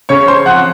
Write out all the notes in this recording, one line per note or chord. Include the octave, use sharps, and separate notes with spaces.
C#3 C#5 C#6
C5 C6
F3 C4 F#5 F#6